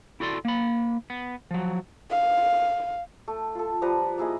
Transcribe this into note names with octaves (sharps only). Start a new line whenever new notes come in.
E4 F#4 A4 D5 C6
A#3 B5
B3
F3 F#3
F5
A3
F4 A4
F3 G3 B4 A#5
A#3 E4 G#4 D#5